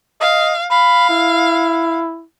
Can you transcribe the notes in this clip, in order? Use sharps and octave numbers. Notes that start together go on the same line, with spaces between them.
D#5 F5
F5 B5
E4